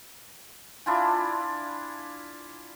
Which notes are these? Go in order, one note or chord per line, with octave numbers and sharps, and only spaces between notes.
D4 E4 F4 G#5